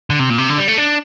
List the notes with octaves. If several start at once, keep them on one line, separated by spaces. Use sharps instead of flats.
D3
C3
A#2
C3
D3
G3
A3
D4